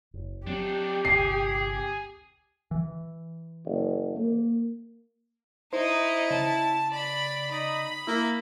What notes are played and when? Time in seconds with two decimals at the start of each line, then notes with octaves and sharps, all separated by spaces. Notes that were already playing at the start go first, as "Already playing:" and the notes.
0.14 F#1
0.47 F#3 C4 D4 D#4 G4
1.05 G1 C3 G#4 C7
2.71 E3
3.65 F#1
4.16 A#3
5.73 D#4 E4 C5 D#5
6.31 C#3 A5
6.91 D5 B5
7.51 D#4 B5
8.07 A#3 E4